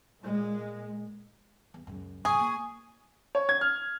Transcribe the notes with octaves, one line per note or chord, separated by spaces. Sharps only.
A#2 G#3
E2
C#2 F#2
G2 C#3 G#4 G#5 C#6 D#6
A#3
C#5
G#6
F6